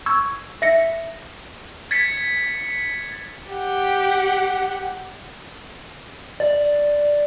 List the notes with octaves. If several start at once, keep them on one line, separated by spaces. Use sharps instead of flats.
C#6 E6 G#6
E5 A#6 C#7
G#6 A6 B6 C#7
G4 F#5
D5